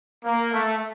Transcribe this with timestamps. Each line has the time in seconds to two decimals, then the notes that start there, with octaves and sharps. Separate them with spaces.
0.24 A#3
0.52 A3